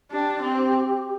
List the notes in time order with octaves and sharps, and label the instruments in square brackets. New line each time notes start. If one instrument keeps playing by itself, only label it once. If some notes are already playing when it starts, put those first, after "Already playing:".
[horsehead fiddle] D4 [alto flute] G4
[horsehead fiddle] C4